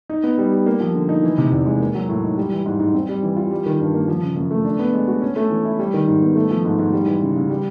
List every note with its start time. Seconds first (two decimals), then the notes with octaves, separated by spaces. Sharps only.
0.10 D#4
0.24 B3
0.38 G3
0.52 G4
0.66 A#3
0.80 F3
0.95 D3
1.09 D#4
1.23 E3
1.38 C3
1.52 E2
1.66 G#3
1.80 A#3
1.95 F#3
2.09 A2
2.23 D#4
2.38 G3
2.52 E3
2.66 G#2
2.79 G#2
2.94 C4
3.09 G3
3.23 E3
3.37 F4
3.51 G3
3.66 D#3
3.80 G2
3.94 A#3
4.08 F3
4.22 C#3
4.36 F#2
4.51 A3
4.64 D4
4.79 B3
4.94 G#3
5.08 F#4
5.21 C#4
5.36 A3
5.50 E3
5.65 E4
5.79 G3
5.94 D#3
6.08 G#2
6.22 B3
6.36 A3
6.51 F3
6.65 G#2
6.79 G#2
6.93 G3
7.06 E3
7.21 C#3
7.36 C#3
7.50 G3